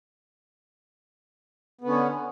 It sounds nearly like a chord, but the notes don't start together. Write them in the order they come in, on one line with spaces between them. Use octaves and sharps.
B3 D3 C#4